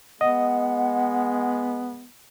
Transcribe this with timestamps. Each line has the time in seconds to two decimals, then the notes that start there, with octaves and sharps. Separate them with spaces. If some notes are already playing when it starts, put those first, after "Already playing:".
0.21 G#3 B3 D#5 F#5